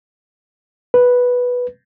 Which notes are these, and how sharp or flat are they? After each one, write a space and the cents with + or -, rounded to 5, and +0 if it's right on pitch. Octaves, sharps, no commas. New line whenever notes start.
B4 -5